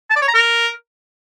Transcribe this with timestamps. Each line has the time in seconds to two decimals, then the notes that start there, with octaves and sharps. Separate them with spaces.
0.10 A5
0.16 D5
0.22 C#5
0.28 A#5
0.34 A#4